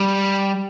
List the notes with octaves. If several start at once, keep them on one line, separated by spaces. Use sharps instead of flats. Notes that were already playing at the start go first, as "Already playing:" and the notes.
Already playing: G3